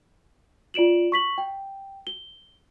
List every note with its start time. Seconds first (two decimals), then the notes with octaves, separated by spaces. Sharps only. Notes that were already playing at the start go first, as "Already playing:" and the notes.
0.74 F4 D5 D7 E7 F#7
1.12 C#6 B6 F#7
1.38 G5
2.07 G7